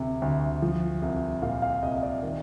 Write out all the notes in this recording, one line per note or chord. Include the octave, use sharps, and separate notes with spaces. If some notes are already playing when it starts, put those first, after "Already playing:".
Already playing: D2 C3
D2
F3
C2
A#2 F5
F5
C2 D#5
D5
D#3